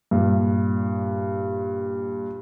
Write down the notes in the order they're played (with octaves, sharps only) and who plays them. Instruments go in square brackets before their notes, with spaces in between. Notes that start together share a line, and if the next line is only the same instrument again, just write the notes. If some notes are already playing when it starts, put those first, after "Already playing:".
[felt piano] G2 A#2